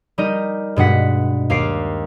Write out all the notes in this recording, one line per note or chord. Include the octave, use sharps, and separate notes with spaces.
G3 D#4 A#4 D#5
G2 B2 G#3 F#5 B6
D#2 F5 D6 C7 D7